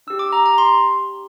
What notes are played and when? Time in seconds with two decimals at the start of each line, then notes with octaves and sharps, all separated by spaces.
0.07 D4 E6
0.10 G4
0.19 D6
0.33 A#5
0.46 A#5
0.58 C6